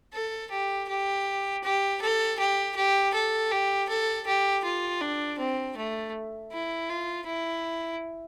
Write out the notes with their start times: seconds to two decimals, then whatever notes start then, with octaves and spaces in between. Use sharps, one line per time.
0.14 A4
0.52 G4
0.89 G4
1.64 G4
2.01 A4
2.39 G4
2.76 G4
3.14 A4
3.51 G4
3.89 A4
4.26 G4
4.64 F4
5.01 D4
5.39 C4
5.77 A3
6.52 E4
6.89 F4
7.27 E4